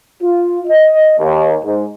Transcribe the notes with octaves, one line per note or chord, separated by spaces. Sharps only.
F4
D#5
D#2
G#2